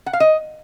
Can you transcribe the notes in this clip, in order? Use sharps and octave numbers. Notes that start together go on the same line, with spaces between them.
F#5
F5
D#5